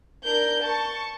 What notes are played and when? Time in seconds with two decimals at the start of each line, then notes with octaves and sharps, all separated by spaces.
0.24 D4 A#4 G6
0.63 A5 C#6